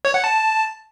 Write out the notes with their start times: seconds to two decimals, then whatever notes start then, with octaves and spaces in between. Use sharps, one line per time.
0.05 C#5
0.14 F#5
0.24 A5